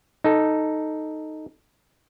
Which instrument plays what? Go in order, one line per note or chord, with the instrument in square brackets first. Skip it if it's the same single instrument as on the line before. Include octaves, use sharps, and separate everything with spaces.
[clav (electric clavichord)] D#4 A4